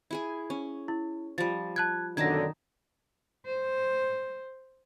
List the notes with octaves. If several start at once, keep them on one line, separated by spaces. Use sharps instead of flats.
E4 G#4 G#5
C#4
E4
F3 G3 A6
A5 F#6 G#6
B1 F#2 D3 D#3 D#4 A5 G#6 A#6
C5